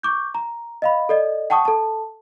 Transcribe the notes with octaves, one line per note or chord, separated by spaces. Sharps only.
C#6 D6 G6
A#5
D#5 F5 B5
A4 D5 D#5
F#5 G5 A5 C#6 D#6
A4 A5